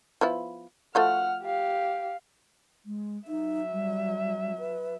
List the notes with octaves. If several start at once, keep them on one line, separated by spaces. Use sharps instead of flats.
F3 B3 E4
F3 A3 F#4 F#5 F6
G4 F5
G#3
F#3 D#4 E5
G3
B4